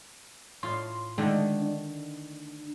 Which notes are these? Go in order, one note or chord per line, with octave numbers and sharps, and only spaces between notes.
A2 F4 C6
D3 D#3 G#3 A3
D4